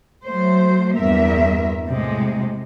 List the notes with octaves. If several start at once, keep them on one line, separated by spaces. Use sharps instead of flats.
F#3 A3 C5
E2 G2 A#4 E5
A2 C3 G#3